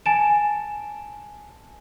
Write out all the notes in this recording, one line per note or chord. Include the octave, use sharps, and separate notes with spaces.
G#5 A5 A6 D7 E7